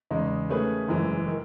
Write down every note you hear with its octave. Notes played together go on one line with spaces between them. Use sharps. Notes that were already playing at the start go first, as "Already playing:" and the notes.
E2 C#3 G#3 D#4
D#3 A3 C#4 G#4 B4
F#1 F#2 E3 G#3
D#3